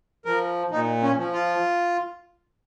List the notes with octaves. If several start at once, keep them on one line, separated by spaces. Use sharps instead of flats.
F3 A#4
A#2 D#4
C#4
F3
F4